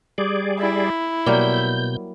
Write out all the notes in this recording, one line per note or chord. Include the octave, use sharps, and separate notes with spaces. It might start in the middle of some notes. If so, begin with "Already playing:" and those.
G3 G#4 D5
E4
B2 F#3 G3 A#3 G6